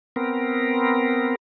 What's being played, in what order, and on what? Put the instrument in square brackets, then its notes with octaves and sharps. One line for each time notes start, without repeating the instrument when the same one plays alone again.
[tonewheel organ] B3 C4 A#4